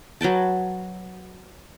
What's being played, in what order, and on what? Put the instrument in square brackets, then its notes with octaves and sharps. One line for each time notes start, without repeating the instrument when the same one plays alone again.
[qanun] F#3 B4 G5 A5